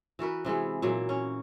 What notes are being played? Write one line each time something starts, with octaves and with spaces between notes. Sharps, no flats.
E3 F#4 A#4 B4
C3 E3 G#3 B3
A#2 E3 F#3 A#3
C#4